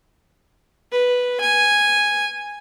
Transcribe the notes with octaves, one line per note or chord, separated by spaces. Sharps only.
B4
G#5